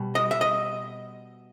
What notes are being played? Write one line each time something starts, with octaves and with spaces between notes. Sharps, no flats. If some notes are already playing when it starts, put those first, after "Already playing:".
Already playing: B2 G3
D#5
E5
D#5